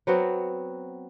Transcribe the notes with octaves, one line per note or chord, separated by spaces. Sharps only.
F#3 B3 C4 F#4